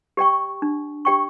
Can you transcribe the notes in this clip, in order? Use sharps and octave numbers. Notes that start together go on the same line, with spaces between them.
G4 D5 G5 C#6
D4
G4 D5 G5 C#6